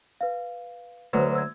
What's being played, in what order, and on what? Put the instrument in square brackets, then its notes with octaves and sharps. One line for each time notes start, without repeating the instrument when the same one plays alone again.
[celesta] B4 F5
[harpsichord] D2 F#3 [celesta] B4 C5
[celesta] E6 G#6